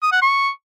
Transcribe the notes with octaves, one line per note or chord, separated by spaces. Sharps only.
D#6
F#5
C#6